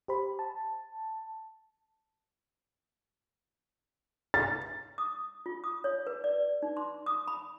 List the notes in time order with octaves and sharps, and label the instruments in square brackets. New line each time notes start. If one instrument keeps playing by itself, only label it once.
[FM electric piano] G4 C5 B5
A5
[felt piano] A6
[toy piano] D#6
F4
D#6
C#5
B4
D5
D#4
C6
D#6
B5